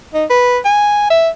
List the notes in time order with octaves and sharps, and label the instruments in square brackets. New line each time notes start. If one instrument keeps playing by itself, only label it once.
[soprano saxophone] D#4
B4
G#5
E5